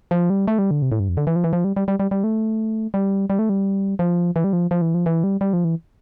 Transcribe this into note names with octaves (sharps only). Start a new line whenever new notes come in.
F3
G3
A3
G3
D3
C3
A2
G2
F2
D3
E3
F3
E3
F3
G3
G3
G3
G3
G3
A3
G3
G3
A3
G3
F3
E3
G3
F3
F3
E3
F3
E3
G3
G3
F3
E3